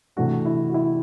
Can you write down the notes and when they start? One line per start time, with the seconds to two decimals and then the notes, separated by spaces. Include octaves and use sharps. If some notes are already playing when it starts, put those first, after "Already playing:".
0.16 C3 E3 A3 D4 F#4
0.45 E4
0.69 F#4
0.74 E4